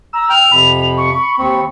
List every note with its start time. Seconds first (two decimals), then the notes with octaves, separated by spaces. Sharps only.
0.13 A#5 E6
0.30 G5 F6 G6 F7
0.52 F2 C3 B5
0.97 C#6
1.38 D#2 C4 C#6